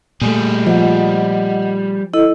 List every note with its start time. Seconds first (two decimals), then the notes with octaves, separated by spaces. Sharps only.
0.21 A#2 G3 A3 G#4
0.66 F3 D#5 F#5
2.14 E4 A4 D#5